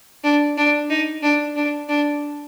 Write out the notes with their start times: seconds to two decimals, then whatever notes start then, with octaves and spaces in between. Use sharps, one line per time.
0.24 D4
0.58 D4
0.90 D#4
1.23 D4
1.56 D4
1.89 D4